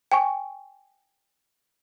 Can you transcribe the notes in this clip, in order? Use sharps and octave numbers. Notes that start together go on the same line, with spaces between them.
G5 G#5 C#6